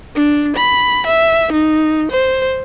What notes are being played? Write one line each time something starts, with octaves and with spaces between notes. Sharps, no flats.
D4
B5
E5
D#4
C5